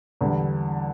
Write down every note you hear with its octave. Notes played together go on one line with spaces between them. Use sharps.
E2 D3 G3